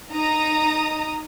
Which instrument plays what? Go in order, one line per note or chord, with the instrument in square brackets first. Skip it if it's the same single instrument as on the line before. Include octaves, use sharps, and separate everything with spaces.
[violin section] D#4 A#5 D#6